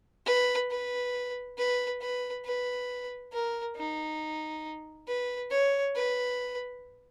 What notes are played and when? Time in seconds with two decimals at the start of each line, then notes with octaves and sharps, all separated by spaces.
0.26 B4
0.71 B4
1.58 B4
2.01 B4
2.45 B4
3.32 A#4
3.76 D#4
5.08 B4
5.51 C#5
5.95 B4